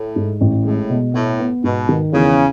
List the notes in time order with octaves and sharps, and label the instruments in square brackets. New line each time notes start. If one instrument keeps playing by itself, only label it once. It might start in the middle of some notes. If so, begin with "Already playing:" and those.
Already playing: [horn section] A2
[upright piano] G#2
A1
[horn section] A2 [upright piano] G#3
[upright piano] B2
[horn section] A2 [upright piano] B3
[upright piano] B3
[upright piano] G#2 [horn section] B2
[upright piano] D#3
[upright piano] E2 [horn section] C#3